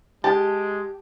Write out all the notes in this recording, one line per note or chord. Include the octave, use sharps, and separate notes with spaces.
G#3 G4 A5